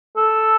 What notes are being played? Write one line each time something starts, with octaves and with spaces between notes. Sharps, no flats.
A4